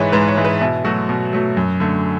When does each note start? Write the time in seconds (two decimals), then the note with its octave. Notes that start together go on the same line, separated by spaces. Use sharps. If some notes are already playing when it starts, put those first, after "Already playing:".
Already playing: G#2 E3 G#3 B4 C#5
0.12 G#2 B4
0.28 C#5
0.37 E3 G#3
0.45 B4
0.61 B2 E4
0.85 F#3 A3 F#4
1.09 B2
1.33 F#3 A3
1.57 F#2
1.80 D3 A3